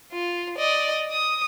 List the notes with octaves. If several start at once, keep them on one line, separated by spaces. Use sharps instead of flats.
F4
D5 D#5
D#6